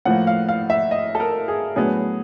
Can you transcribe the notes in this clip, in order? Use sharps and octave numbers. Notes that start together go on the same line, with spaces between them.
A2 F3 A#3 F#5
F5
F5
E5
D#5
A4
A#4
G#4
A2 F#3 B3 D4 G#4